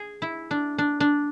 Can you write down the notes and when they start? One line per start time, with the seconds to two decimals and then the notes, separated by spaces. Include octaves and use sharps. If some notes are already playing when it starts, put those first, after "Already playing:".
Already playing: G#4
0.22 E4
0.51 D4
0.78 D4
1.00 D4